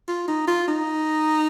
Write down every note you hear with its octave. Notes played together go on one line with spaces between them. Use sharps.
F4
D#4
F4
D#4